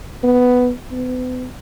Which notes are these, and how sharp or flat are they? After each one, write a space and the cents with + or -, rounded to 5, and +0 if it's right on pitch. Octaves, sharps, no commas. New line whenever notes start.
B3 +5
B3 +40